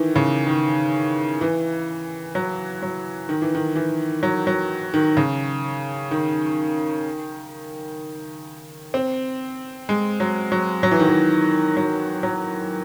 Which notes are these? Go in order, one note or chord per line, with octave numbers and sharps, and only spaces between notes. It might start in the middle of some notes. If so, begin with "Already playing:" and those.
Already playing: D#3 E3
C#3
D#3
E3
F#3
F#3
D#3
E3
D#3
E3
F#3
F#3
D#3
C#3
D#3
C4
G#3
F#3
F#3
F#3
E3
D#3
E3
F#3
F#3